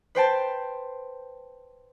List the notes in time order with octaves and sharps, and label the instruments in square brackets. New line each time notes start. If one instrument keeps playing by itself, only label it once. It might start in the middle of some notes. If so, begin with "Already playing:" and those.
[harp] B4 C5 G5 A5